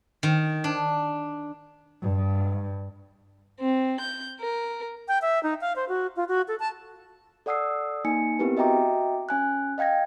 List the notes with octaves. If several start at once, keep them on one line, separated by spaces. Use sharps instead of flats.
D#3
D4
G2
C4
G6
A#4
G5
E5
D#4
F5
C5
F#4
F4
F#4
A4
A5
A4 D5 F#5 D#6 E6 C7
A#3 D#4 G#5 C#7
B3 C4 E4 G4 A#4 B4
F#4 D#5 E5 G5 A#5 D6
C#4 G#5 F#6
D#5 F5 G5 G#6 A#6